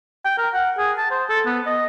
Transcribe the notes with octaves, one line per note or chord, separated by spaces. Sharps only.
G5
A#4
F#5
G#4
A5
C5
A4
B3
D#5